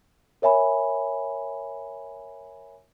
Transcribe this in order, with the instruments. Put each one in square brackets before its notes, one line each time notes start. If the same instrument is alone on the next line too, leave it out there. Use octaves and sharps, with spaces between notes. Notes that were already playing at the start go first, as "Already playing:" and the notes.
[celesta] A#4 C#5 E5 G#5 B5